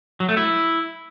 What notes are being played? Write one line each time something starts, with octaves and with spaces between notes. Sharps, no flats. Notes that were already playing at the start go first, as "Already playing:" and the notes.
F#3
A3
E4